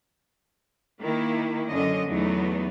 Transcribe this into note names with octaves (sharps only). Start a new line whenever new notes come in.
D#3 A#3 E4
F#2 D3 C#4 D#5
E2 F#3 A3 B3 D#4